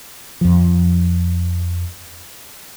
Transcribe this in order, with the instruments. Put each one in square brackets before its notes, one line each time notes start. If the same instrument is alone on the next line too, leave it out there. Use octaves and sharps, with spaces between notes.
[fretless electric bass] F2 F3